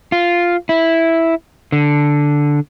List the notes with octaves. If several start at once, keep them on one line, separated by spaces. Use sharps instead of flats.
F4
E4
D3